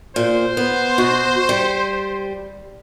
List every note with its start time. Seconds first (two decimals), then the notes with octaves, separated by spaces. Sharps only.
0.16 A#2 C5
0.57 B3
0.98 B2 F#4
1.49 G3